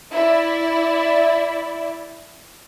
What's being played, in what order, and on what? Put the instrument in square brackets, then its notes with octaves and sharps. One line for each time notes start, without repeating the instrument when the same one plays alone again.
[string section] E4 D5